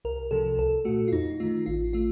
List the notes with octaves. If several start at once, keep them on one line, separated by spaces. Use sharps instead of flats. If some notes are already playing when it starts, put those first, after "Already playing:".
C2 A#4
C3 F3 A4
C2 A4
A#2 A3 F#4
F4
F2 D#4
D#3 A3 F4
A1 F4
A3 F4